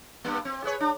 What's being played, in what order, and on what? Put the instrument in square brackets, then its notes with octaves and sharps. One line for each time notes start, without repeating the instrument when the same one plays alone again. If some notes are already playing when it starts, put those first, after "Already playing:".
[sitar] G2 A#3
C4
G#4 B4 C#5
D4